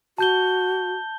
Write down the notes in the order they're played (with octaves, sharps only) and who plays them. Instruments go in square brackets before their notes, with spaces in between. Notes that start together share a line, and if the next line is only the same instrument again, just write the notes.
[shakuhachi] F#4 [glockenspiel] A5 G6 G7